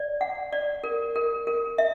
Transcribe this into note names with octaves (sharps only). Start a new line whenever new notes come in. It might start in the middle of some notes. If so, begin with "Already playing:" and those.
Already playing: D5
F#5
D5
A#4
A#4
A#4
E5